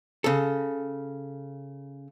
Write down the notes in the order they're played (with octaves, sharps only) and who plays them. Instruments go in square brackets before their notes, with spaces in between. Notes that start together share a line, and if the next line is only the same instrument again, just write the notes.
[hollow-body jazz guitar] C#3 A4